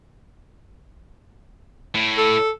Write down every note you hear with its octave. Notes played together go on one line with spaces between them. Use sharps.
A2
A4